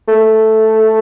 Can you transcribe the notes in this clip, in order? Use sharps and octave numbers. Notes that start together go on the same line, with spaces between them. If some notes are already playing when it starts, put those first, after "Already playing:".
A3